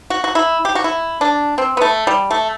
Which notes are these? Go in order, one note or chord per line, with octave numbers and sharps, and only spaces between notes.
F#4
F#4
E4
G4
F#4
E4
D4
C4
B3
A3
G3
A3